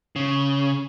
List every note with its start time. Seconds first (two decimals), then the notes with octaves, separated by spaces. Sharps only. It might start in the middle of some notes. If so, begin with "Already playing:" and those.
0.16 C#3